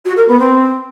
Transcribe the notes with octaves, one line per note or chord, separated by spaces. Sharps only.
F#4
A#4
B3
C4